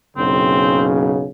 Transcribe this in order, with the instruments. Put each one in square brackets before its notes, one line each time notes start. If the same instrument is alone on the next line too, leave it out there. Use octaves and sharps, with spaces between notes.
[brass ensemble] F#1 B1 C#3 [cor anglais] C4